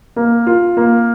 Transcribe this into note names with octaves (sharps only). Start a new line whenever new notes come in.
A#3
F4
A#3